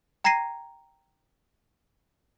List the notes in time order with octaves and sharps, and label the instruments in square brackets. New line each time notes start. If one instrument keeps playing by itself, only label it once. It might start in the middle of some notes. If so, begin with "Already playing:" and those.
[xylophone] G5 A#5 G#6 A#6 C7 D#7